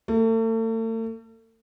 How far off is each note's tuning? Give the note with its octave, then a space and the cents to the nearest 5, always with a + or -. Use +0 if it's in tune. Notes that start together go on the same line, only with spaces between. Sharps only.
A3 +40